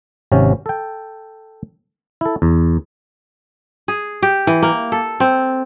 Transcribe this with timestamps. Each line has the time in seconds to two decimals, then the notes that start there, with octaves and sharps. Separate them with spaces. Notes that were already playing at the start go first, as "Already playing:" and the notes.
0.32 G#1 C3 C#4
0.66 A4 G5
2.21 E4 A4
2.42 E2
3.88 G#4
4.22 G4
4.47 E3
4.62 A#3
4.92 A4
5.20 C4